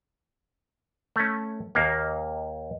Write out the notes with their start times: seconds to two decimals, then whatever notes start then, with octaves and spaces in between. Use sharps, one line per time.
1.16 A3 C#4
1.75 D#2 A#3